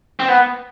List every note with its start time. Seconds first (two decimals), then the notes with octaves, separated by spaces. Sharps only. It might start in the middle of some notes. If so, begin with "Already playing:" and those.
0.20 C4
0.28 B3